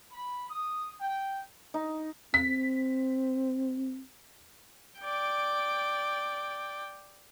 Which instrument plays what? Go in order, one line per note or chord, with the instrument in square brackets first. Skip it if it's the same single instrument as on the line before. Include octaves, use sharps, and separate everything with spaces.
[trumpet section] B5
D#6
G5
[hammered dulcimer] D#4
[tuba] C4 [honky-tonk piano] B6
[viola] D5 G5